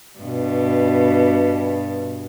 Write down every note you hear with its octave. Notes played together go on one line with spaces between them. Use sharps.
G2 B2